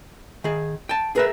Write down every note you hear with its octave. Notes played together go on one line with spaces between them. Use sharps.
D#3 G#4
G5 A5
G#4 A#4 B4 E5